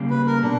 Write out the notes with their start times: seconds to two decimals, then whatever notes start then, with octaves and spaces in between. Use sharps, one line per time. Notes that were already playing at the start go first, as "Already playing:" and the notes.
Already playing: C#3 G3 A#3
0.10 B4
0.27 A#4
0.43 B2 D4